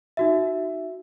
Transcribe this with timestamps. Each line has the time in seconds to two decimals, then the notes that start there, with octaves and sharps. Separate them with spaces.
0.17 D#4 F#4 E5